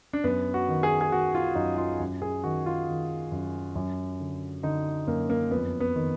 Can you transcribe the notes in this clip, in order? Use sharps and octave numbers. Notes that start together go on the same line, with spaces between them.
D4
F#2 B3
F#4
D#3
G#4
G#4
D#3 F#4
F4
F#2 D#4
F4
F#2
G#4
D#3 F#4
F4
D#3
F#2
F#2
D3
D3 D#4
F#2 A#3
A#3
F2 B3
B3
D#3